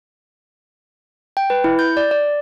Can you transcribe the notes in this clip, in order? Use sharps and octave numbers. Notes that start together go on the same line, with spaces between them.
G5
B4
E4
G6
D5
D5